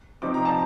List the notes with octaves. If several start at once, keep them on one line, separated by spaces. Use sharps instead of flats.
C3 F3 C4 D#4 D6
A#5
A5